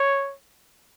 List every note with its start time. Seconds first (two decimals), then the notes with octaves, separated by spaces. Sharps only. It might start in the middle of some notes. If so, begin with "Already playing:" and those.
Already playing: C#5